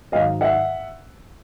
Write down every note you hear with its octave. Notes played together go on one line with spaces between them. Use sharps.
G#2 D#3 F#3 D#5 F5
E5 F#5